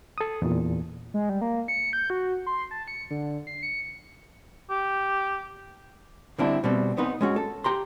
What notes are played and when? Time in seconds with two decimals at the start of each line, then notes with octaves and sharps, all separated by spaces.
0.18 A4 D#6
0.42 E2 A#2
1.14 G#3
1.29 G3
1.41 A#3
1.68 C#7
1.93 G6
2.10 F#4
2.46 C6
2.71 A5
2.88 C#7
3.11 D3
3.47 C7
3.63 C#7
4.70 G4
6.39 D3 G3 C4 D4 E4
6.64 B2 G3 C4
6.97 B3 C4 D#4 B4
7.21 G#3 C#4 F#4
7.36 A4
7.64 G4 A#5 C6